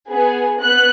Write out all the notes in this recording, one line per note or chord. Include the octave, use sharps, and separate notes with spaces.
B3 G#4
B3 F#6